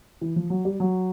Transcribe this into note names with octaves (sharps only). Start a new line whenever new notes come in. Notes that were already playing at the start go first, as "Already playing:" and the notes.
E3
F3
F#3
G3
F#3